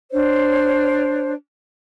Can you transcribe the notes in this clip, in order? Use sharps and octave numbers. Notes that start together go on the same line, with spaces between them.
D4 C5 C#5